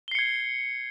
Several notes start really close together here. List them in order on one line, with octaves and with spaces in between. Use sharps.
G7 C7 C#7 G#6